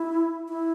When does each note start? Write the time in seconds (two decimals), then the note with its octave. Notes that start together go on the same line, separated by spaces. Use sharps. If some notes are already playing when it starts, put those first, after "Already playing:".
Already playing: E4
0.48 E4